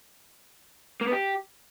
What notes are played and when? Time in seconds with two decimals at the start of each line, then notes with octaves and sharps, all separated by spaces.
1.01 A#3
1.07 B3
1.13 G4